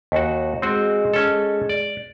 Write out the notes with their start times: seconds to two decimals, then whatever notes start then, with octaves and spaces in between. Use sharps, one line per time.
0.12 D#2 F#4
0.62 G#3 C4 F#4
1.14 C#4 A4
1.69 D5